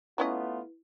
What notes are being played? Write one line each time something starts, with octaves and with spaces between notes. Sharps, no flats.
F#3 A3 B3 C#4 E4 F4 B4 D#5